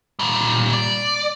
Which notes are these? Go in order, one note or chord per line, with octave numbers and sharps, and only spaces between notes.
A#2 G3
D5